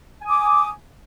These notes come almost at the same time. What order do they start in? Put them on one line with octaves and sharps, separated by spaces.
G#5 D#6 D6